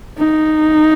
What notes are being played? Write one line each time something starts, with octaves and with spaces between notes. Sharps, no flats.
D#4